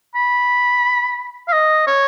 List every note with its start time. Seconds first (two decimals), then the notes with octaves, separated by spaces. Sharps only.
0.15 B5
1.48 F5
1.53 D#5
1.87 C#5